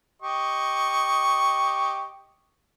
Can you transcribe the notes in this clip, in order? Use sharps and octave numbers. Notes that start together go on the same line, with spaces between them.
G4 D#5 C#6